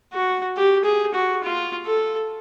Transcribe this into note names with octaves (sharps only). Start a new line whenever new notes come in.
F#4
G4
G#4
F#4
F4
A4